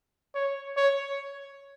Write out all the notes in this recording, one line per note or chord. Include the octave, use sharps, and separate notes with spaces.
C#5
C#5